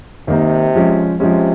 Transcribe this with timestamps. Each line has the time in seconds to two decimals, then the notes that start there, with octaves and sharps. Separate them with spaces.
0.28 C3 D#3 A#3 D#4
0.75 F3 G#3 C#4
1.19 C3 F3 G#3 C#4